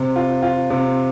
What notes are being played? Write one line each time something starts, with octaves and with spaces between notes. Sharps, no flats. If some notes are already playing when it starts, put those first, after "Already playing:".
Already playing: C3
F4
F4
C3